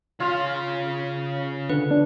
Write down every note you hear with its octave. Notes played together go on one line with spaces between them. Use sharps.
C#3 F4 F5
D3 B4
D4